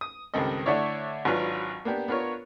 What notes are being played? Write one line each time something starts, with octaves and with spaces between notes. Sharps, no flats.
D#6
C#2 G2 D#3 C4 A4 D#5
D3 A3 D4 E4 C#5 D5
G#1 F#3 D4 F4 B4 B5
A#3 B3 D4 G4
B3 D4 F4 A#4 C#5